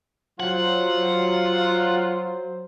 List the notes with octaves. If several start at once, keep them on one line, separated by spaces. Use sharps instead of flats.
F#3 F4 C5 F#5